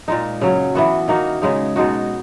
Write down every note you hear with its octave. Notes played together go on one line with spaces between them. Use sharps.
A#2 G#3 D#4
C#3 F#3 C#4
E3 B3 F#4
D#3 A#3 D#4 F#4
C#3 G#3 D#4
B2 G#3 D#4 F#4